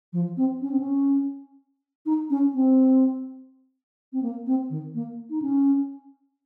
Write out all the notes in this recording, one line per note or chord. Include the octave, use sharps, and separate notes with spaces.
F3
C4
C#4
C4
C#4
D#4
C#4
C4
C4
A#3
C4
D#3
A#3
D#4
C#4